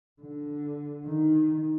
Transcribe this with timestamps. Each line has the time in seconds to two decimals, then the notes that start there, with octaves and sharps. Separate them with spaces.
0.22 D3
1.06 D#3